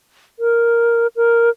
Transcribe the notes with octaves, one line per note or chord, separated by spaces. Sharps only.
A#4
A#4